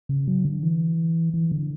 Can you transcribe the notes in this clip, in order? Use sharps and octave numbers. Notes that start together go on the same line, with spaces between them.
C#3
F#3
D3
E3
E3
D3